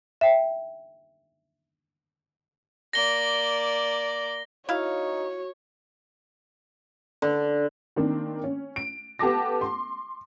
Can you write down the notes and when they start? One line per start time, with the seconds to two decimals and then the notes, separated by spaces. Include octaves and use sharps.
0.21 E5 G5
2.93 A#3 D5 A#6 G7
4.69 D#4 E4 F#4 C#5 F5
7.22 D3
7.96 D#3 A#3 C4 D4
8.44 C#4
8.76 D7
9.19 B3 G4 A4 A5 D6 A#6
9.61 C6